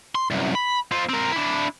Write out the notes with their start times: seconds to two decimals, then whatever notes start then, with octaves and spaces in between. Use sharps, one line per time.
0.15 C6
0.31 C2 F#2
0.55 B5
0.92 C4 F4
1.09 C4 A#4
1.32 D4 E4